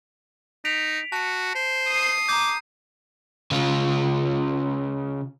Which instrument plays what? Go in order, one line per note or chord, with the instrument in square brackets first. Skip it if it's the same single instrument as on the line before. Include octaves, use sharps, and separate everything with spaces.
[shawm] D#4 [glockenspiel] B6 D7 F7
[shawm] F#4 [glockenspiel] A5 C#7
[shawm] C5
[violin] D#6 C7
[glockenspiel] A#5 G6 [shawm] D6
[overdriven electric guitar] C#3 F4